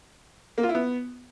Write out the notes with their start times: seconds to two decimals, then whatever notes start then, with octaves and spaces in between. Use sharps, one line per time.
0.58 A#3
0.63 F4
0.69 E4
0.75 B3